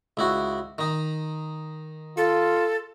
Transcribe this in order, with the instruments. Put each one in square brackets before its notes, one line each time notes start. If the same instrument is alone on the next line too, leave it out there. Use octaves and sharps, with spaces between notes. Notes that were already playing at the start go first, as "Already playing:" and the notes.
[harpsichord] C#2 E4 F#4
D#3 D#4
[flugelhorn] F4 [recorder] A4